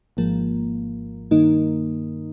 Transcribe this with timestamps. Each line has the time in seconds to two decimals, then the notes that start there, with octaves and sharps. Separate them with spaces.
0.17 G#1 G#2 F3 A#3
1.31 G2 D#3 A#3 D#4